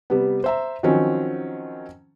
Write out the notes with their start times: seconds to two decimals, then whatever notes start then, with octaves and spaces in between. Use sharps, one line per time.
0.10 C3 G3 B3
0.44 C5 E5 A#5
0.83 D#3 F3 F#3 C4 C#4